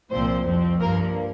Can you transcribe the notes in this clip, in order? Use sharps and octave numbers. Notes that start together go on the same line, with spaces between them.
C2 A#2 F3 C4 C5
F2 F3 C4
G2 F3 A#3 A#4